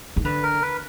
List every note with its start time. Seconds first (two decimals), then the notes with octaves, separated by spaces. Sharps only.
0.16 D#3
0.25 D3 B4
0.43 A#4
0.62 B4